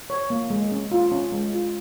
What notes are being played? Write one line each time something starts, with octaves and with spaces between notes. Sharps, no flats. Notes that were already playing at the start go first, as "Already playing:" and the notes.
C#5
A#3
G#3
C#4
F4
C#4
G#3
F4